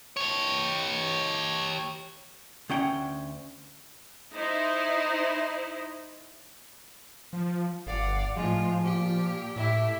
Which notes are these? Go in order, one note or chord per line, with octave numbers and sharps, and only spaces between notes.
G4 C#5
D2 C#4 F#5 G5
D#4 E4 C5
F3
G1 D5 F5 F#5
A2 F3 G#3 F4
A#2 G4
A2 E4 G4 E5